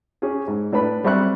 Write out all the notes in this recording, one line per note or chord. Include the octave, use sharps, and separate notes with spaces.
C#4 G4 G#4
G#2
A2 D4 B4 B5
F#3 G3 C4 E5 C#6 F#6